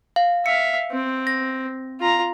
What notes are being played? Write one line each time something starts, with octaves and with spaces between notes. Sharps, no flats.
F5
E5 F5 C#7
C4
A#6
F4 A#5